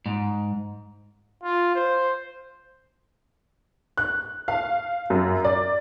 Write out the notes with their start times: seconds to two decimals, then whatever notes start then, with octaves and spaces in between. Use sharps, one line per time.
0.06 G#2
1.44 F4
1.75 C5
3.97 F#6
4.48 F5
5.10 F#2
5.45 D5